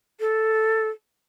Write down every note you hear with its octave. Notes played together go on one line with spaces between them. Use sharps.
A4